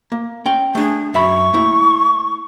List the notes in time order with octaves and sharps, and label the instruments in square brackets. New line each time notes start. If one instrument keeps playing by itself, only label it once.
[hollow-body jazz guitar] A#3
C#4 G5
[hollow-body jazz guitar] A3 D4 [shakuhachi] G#4
[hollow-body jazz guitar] F#2 E5 B5 [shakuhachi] C#6
[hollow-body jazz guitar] A3 A#3 E4